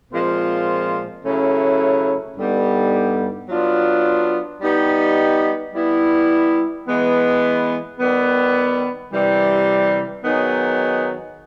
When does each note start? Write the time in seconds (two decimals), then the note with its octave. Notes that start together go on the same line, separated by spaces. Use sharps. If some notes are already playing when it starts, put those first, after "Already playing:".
0.12 A#2 F3 G#3 C4 F4
1.25 C#3 F#3 A3 C#4 E4
2.37 G2 D3 G3 B3 D#4
3.49 F#3 B3 D4 F4
4.61 G3 B3 D#4 G4
5.74 G3 B3 E4
6.87 E3 G#3 B3
7.99 D#3 G3 B3
9.12 C3 E3 G3
10.24 D#3 F#3 B3 D#4 G#4